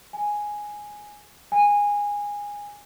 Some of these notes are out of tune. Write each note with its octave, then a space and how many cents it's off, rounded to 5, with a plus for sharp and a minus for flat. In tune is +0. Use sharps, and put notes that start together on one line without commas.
G#5 +0
G#5 -20